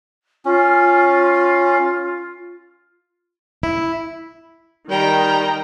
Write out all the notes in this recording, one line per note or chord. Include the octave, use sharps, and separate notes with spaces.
C#4 F4
E4
D#3 G3 G5 A#5